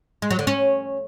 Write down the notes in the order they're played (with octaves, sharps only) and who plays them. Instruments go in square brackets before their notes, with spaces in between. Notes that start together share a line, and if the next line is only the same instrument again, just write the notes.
[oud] G#3
F#3
D3
C#4